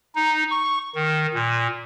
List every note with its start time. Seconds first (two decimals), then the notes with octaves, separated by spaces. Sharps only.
0.15 D#4
0.51 C#6
0.95 D#3
1.34 A#2